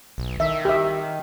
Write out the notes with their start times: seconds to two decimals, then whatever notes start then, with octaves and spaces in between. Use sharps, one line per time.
0.18 B1
0.40 D#3 E5
0.65 G4 E5